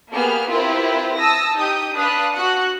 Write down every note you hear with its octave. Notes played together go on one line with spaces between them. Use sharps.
A#3 B3 G4 G#4 F6
C4 E4 F4 G4 A#4 B4
A5 D#6 E6 A#6
D#4 G4 D#6 G6
D4 B4 F5 B5 D#6 F#6
F#4 F#5 F#6